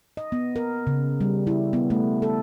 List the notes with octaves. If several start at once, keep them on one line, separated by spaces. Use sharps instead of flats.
D#5
B3
A#4
C#3
G3
E4
B3
A3
A4